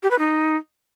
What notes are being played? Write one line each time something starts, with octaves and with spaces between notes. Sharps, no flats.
G4
B4
D#4